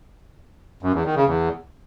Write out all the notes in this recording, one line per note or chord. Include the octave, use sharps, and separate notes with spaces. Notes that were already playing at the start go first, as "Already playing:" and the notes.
F#2
E2
D#3
C#3
E2